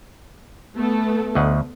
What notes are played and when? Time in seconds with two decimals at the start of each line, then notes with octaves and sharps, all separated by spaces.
0.75 A3 B3 A4
1.35 D2 D#5 F#5